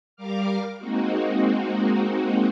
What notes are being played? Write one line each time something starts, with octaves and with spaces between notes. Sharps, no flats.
G3 A#4 F5 D6 F6
G#3 A#3 C4 D#4 F#4